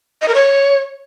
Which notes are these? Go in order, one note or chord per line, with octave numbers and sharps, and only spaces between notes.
D#5
A#4
C#5